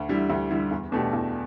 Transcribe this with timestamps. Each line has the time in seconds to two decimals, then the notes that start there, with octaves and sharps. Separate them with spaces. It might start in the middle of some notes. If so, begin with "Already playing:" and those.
Already playing: D2
0.09 D3 G3 E4
0.30 D2
0.51 D3 G3 E4
0.71 E2
0.92 B2 A3 D4 G4
1.13 E2